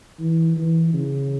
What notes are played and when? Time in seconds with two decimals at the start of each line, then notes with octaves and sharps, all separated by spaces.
0.19 E3
0.57 E3
0.93 C#3